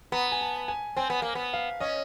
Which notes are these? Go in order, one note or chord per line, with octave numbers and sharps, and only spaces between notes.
B3 A#5
G#5
A5
G#5
C4 G#5
B3
A#3
B3
F5
C#4 D#5